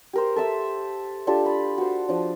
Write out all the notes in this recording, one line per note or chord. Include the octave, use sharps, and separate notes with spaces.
G4 A#4 C5
A4 E5 E6
D4 F4 G4 A4
B5
F#4 C5
F3 D4